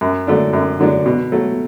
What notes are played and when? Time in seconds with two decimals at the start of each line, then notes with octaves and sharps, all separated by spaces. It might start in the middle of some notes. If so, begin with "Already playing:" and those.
0.01 F#2
0.27 D3 F#3 A3 D4
0.53 F#2
0.80 D3 F#3 A3 D4
1.06 B2
1.32 F#3 A3